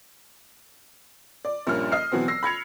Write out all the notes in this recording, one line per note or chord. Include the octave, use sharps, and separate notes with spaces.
D5
A#1 G2 A#2 A#3 C#4 F6
D#5 F6 C7
B2 E3 F#3 B3 C4
E6 A#6 C7
B5 G#6 C#7 F7